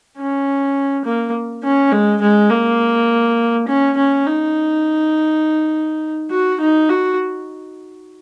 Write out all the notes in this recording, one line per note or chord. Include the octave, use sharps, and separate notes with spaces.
C#4
A#3
C#4
G#3
G#3
A#3
C#4
C#4
D#4
F#4
D#4
F#4